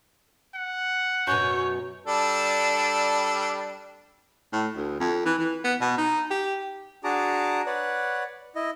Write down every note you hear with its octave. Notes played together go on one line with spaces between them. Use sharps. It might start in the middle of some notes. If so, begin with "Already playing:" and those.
F#5
F#2 B2 C#5 G6
G3 D4 A4
A2
D2
F2
E3
E3
B3
B2
D#4
G4
D4 F#4 G#4 A5 A#5 D6
B4 C#5 D5 F#5
E4 D#5